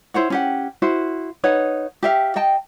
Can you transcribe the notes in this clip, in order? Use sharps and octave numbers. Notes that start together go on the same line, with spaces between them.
E4 C5 C#5 F#5
C#4 G4 F#5
E4 F#4 C5
D#4 B4 C#5 F#5
G4 E5 F5
D#5 G5 A5